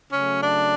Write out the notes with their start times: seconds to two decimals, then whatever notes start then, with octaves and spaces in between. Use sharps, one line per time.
0.10 C#3 F#3 A3 C#4
0.41 D4